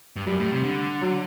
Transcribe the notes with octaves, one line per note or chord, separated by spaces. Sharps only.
G2
F#2 G3
A2
C3
D3
F#3